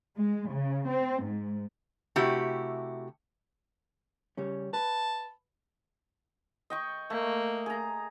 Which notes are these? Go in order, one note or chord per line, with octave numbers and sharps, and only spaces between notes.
G#3
C#3
C4
G#2
C3 A3 E4 F#4 G4
C#3 G3 C#4
B4 A5
D#5 G5 C#6
A3 A#3
G#4 A#5